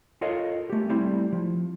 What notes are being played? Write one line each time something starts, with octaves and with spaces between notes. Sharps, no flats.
F4 A4 A#4 C#5 D#5 F5
A3 G4
G3 A3 C4 E4
F3